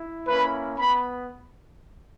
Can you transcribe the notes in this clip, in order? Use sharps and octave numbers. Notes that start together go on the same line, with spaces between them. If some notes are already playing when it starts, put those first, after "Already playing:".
Already playing: E4
A#3 C#4 E4 B4 B5
B3 B5